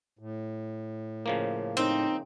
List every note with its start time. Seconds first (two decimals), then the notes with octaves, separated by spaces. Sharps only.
0.19 A2
1.26 C#3 F3 A#3
1.77 C4 D#4